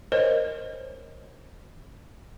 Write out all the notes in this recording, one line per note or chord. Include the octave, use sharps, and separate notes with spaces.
A#4 C5 C#5 D#5